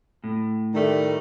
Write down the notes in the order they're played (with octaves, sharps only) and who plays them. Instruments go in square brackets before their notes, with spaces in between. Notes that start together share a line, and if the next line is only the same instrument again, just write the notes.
[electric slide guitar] A2
[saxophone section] D#3 G3 A3